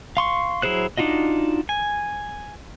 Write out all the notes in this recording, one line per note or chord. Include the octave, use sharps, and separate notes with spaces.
F5 C6 C#6
F#3 E4 G#4 C5 F#6
D4 D#4 F4 F#4 D#5
G#5